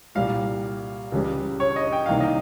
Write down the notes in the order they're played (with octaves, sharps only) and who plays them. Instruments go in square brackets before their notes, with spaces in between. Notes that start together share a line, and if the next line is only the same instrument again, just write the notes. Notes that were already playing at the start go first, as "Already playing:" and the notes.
[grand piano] C2 A#2 G3 [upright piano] F5
[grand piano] C#2 C#3 G3
[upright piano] C#5
D#5
G5
[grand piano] C2 C3 D#3 A#3 [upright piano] F5
[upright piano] D#5